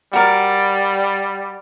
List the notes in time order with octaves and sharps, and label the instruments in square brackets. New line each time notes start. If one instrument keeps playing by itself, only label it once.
[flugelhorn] G3 [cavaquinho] F#4 A#4 D5